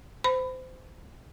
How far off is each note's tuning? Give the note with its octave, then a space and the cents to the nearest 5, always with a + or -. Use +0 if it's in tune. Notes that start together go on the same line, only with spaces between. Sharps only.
C5 -25 B5 +20